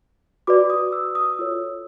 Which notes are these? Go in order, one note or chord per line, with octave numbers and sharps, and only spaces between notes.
F#4 B4 D5 D6
D#6
E6
D#6
F4 A4 C#5 E6